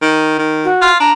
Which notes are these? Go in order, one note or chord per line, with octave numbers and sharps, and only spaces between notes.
D#3
D#3
F#4
F4
D4 A#5